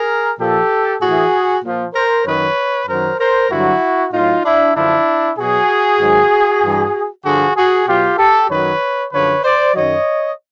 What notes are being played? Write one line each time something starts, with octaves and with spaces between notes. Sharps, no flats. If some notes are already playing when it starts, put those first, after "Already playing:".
Already playing: G#4 A#4
A#2 F3 G4 A4
A2 E3 F#4 G#4
A#2 F3
A#4 C5
F#2 D#3 F#3 B4 C#5
F#2 D#3 F#3 A#4 C5
A#4 C5
G2 D3 F#3 E4 F#4
A2 F#3 D#4 F4
D4 E4
F#2 D3 F3 D4 E4
B2 F#3 F#4 G#4
G#2 D#3 F#3
G2 E3
G2 D3 F3 F#4 G#4
F#4 G#4
B2 F#3 F4 G4
G4 A4
F#2 D#3 F#3 B4 C#5
F#2 D3 F3 B4 C#5
C5 D5
F#2 D#3 F#3 C#5 D#5